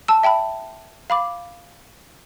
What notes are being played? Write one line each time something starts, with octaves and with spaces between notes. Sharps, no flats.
A5 E6
E5 G5 A5 B5
F5 B5 D6